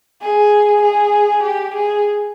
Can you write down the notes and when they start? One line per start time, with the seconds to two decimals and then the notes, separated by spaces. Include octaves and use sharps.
0.21 G#4
0.82 G#4
1.43 G4
1.75 G#4